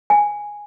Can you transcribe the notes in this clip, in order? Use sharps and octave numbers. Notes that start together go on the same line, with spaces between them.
G#5